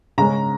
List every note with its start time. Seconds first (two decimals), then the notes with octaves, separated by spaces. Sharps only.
0.18 C#3 G#3 C#4 A#5